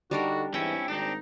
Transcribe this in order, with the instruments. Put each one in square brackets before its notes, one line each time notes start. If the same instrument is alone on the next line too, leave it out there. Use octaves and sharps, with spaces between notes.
[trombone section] D3 D#4 [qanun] G3 D4 A#4 [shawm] F#4
[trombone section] E2 G#2 E3 [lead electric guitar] C4 C#4 [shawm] E4 [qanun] G5
[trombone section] G#1 [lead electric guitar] C4 D4 [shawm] D#4